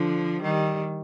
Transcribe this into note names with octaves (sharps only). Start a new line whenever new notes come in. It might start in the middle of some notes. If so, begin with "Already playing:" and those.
Already playing: D3 F3
D#3 G3